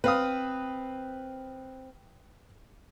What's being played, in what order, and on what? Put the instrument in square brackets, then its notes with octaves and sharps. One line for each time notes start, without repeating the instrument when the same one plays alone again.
[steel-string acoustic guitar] C4 [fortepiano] B4 F5 D#6